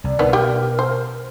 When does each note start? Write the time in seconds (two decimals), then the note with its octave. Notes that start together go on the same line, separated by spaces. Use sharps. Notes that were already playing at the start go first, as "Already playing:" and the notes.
0.04 C2 D5
0.19 B2 D#3 B3
0.33 G4 A#4 G5
0.79 C5